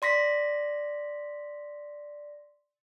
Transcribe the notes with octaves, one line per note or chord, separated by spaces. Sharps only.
D5 C6 A#6 B6